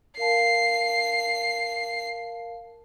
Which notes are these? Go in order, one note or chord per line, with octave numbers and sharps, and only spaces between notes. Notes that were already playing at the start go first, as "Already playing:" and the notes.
A#4 F5 A5 C7